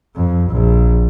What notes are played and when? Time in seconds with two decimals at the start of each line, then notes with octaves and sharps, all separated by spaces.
0.16 F2
0.49 A#1